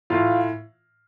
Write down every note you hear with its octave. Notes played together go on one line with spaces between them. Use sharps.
A2 F4 F5